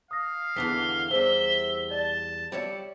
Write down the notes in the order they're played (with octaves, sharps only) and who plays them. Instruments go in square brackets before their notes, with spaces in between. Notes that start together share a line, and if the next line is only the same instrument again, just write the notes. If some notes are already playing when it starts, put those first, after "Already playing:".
[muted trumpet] F5 [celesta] D#6 A#6
[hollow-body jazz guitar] E2 D3 E3 [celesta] B6 [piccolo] G7
[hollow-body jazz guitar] E2 G3 [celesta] C5 [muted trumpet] E5
[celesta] D5 [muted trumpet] A5
[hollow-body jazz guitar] G3 C#5 E5 [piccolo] C#7